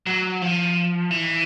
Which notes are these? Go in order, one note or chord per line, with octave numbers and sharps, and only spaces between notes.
F#3
F3
E3